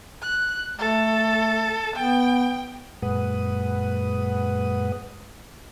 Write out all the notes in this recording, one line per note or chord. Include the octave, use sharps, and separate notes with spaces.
F#6
A3 A4
B3 G5
F#2 A#2 G#3 B4 F#5 D#6